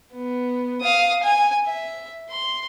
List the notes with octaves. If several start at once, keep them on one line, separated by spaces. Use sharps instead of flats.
B3
F5 D#6
G#5
E5
C6